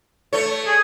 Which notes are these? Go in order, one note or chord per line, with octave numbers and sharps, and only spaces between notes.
A3 C#5
G#4